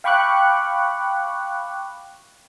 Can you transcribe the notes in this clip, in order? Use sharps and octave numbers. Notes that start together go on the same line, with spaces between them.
F5 G5 B5 C#6 D6 F#6